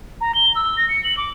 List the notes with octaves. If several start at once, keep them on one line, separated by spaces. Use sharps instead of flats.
A#5
G7
E6
A#6
C#7
F#7
D6